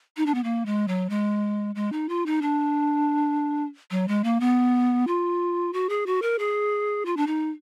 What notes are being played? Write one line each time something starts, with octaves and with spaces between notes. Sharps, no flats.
D#4
D4
B3
A#3
G#3
F#3
G#3
G#3
D#4
F4
D#4
D4
F#3
G#3
A#3
B3
F4
F#4
G#4
F#4
A#4
G#4
F4
D4
D#4